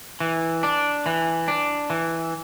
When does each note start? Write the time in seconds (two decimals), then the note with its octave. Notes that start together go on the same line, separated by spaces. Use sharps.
0.20 E3
0.63 D4
1.06 E3
1.48 D4
1.90 E3